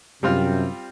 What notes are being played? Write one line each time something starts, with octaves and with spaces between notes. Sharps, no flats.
F#2 C3 G3 C4 F4